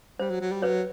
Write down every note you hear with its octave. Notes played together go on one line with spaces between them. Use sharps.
G3 C5
F#3
F#3
G3
F#3 B4 C#5